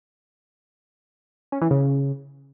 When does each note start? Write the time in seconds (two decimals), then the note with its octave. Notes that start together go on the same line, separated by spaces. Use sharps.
1.52 C#4
1.62 E3
1.71 C#3